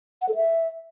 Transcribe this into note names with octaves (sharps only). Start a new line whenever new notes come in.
F#5
A4
E5